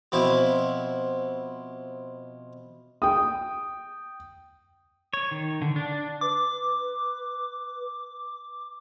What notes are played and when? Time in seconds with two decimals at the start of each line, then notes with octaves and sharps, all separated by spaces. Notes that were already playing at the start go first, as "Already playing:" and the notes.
0.12 B2 F3 C4 E4
3.02 G5 D#6
5.13 C#5
5.31 D#3
5.62 D3
5.76 D4
6.21 B4 D6